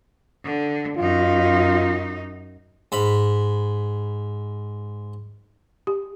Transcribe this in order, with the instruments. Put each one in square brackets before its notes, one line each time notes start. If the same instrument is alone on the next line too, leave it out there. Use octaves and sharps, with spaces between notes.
[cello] D3
[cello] F#2 D#4 [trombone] F4
[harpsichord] G#2 B5
[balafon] G4